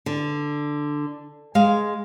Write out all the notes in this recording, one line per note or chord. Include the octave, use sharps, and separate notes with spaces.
D3
G#3 F5